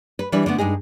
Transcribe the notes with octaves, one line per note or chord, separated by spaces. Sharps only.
B4
E3 G3 D4 B4
D3 A3 B3
G2 G#3 D#4 G#4